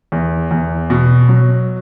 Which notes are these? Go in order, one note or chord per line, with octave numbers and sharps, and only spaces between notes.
E2
E2
B2
F#3